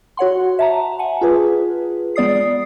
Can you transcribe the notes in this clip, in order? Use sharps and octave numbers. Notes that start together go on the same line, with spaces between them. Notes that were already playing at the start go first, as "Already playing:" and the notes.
F#4 C#5 F#5 C6
E5 A5 A#5
F#5 G#5 A5
F4 G#4 B4
G#3 B3 D5 D#6 C7